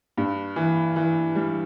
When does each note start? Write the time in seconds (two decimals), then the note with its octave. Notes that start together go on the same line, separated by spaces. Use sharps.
0.17 G2
0.56 E3
0.96 E3
1.35 G3